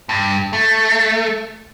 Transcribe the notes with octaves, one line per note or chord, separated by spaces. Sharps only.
G2
A3